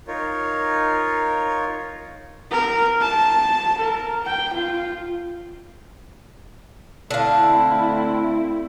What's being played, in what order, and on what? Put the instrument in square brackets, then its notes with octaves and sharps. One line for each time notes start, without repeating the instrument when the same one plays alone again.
[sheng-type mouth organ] D#4 F4 A#4 C#5
[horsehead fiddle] A#4
A5
A#4
G5
F4
[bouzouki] D3 F5 [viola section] A3 C4 E4